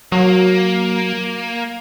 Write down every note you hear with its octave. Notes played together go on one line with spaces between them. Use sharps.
F#3 A#3